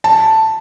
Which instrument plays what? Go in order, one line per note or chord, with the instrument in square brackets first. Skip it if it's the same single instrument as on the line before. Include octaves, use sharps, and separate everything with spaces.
[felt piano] A5